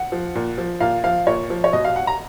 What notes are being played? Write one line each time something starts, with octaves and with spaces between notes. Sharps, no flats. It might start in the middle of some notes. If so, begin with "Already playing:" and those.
Already playing: F#5
F3
A#2
F3
A#2 F5
F3 F5
A#2 C#5
F3
C#5
B2 D#5
F5
F#5
A#5